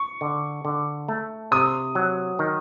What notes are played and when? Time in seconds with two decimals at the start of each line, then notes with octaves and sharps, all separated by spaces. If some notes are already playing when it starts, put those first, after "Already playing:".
Already playing: C#6
0.21 D3
0.65 D3
1.08 A3
1.52 C3 D#6
1.95 F#3
2.39 D#3